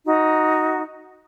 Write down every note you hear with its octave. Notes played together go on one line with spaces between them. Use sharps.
D#4 F#4